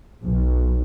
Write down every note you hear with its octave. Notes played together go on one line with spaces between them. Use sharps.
B1